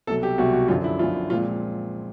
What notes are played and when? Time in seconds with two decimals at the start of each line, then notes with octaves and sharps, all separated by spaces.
0.07 C2 B2 F#3 A4
0.23 G4
0.38 C2 B2 F#3 F#4
0.53 F#4
0.68 F#2 D3 F3 F4
0.84 E4
0.99 F#2 D3 F3 F4
1.30 A#2 F3 G#3 C4 F4